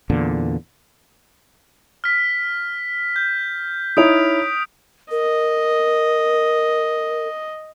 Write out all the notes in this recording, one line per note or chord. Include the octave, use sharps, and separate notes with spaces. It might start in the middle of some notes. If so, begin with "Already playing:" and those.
E2 A#2 D3
F6 B6
G6
D#4 E4 C#5 D#6 D7 F7
A#4 D#5